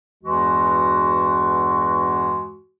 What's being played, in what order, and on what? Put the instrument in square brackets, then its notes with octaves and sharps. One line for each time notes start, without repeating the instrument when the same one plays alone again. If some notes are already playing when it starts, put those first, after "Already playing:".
[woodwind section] E2 G2 E3 G#3 F#4